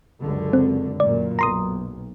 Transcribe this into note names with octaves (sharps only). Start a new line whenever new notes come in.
C#2 F#2 D3
C4
F#2 A#2 D5
B1 A#5 C6 D#6